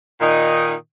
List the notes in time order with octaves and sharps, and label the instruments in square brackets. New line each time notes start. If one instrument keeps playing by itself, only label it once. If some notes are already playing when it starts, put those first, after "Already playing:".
[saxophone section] A#2 D#3 D#4